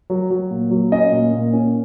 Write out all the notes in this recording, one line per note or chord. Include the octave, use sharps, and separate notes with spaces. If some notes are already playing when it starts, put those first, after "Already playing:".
F#3
F#3
A#2
F#3
C#4 D#5
A#2
A#2
C#4